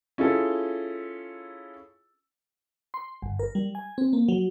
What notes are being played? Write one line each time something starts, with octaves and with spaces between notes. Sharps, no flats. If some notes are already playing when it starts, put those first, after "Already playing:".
C#4 E4 F4 G#4 A4
C6
G1
A#4
G3
G#5
C4
A#3
F#3